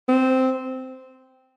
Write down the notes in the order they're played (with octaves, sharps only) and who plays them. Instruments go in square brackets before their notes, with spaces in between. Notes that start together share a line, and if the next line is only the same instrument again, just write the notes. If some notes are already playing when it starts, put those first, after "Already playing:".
[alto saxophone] C4